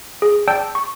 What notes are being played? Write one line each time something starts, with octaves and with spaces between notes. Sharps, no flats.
G#4
D5 G5 A5 E6 G6 D7
C#6